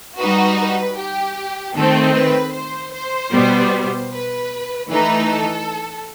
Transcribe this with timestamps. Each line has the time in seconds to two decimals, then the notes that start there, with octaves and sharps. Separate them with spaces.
0.19 G3 D#4 F#4 B4
0.59 B4
0.98 G4
1.75 D#3 A3 C4 A4
2.14 B4
2.53 C5
2.93 C5
3.32 B2 G3 B3
4.11 B4
4.89 E3 A3 D#4 B4
5.28 A4